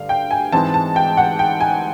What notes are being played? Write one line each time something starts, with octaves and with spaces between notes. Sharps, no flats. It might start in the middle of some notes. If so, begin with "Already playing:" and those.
Already playing: G2 D3 F5
G5
G#5
G#2 E3 G#3 C4 A5
A5
G5
F#5
G5
G#5